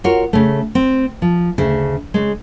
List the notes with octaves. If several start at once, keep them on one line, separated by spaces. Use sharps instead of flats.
F4 F#4 A#4 C#5
C#3 A3
C4
F3
D2 C#3 E5
C#3 G#3